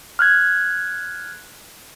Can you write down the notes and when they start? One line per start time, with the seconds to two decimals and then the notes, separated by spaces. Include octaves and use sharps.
0.19 F6 F#6 G#6